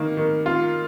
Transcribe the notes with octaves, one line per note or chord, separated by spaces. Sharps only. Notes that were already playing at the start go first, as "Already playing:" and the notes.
Already playing: D#3 A#3
D#3
F4